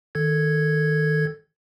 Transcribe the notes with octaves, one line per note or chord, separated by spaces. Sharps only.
D#3 A4 G#6